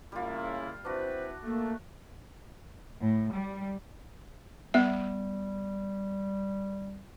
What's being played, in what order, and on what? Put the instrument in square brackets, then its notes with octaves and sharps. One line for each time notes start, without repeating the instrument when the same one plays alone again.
[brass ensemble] C#3 A#3 E4 [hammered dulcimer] G3 F4
[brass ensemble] C4 E4 B4 [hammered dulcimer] D4 F#4 [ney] C5
[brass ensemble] A3 [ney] A#3
[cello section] A2
G3
[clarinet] G3 [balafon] B3 E5